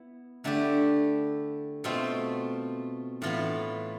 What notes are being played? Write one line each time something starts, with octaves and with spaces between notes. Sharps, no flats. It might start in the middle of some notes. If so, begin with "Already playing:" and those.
Already playing: B3 E4
D3 A3 E4 G4
B2 A3 C4 F4
A2 E3 B3 F4